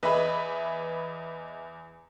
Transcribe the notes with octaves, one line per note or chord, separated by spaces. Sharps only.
E2 G#4 B4 D#5 E5 B5